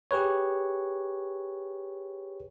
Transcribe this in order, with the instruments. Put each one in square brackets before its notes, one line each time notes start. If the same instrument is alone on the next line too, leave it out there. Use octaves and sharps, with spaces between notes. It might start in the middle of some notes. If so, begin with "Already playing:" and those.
[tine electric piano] G4 G#4 B4 C#5